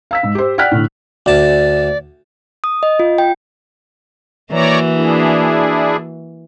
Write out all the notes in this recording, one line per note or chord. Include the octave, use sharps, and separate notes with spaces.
F5 E6 B6
G#2
G4 C5
D5 F#5 G5 F6 F#6 B6
A2 D3
D2 D5 A5
D#6
D#5
F4
G5
E3 A#3 F#4 C#5 D5 A#5
D4 E4 G#4